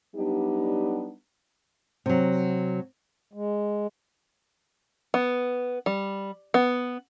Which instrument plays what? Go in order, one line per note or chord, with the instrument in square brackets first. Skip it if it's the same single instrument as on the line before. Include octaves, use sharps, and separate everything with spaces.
[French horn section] F#3 G3 B3 D4 D#4 G4
[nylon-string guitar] C3 F#3
[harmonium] G#3
[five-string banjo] B3
G3
B3